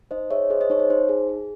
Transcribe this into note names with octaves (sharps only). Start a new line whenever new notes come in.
D#4 C5 D#5
G#4 C#5 E5
G#4 C5 D#5
C5 D#5
D#4 C#5
C5
D#4 C5
G#4
G#4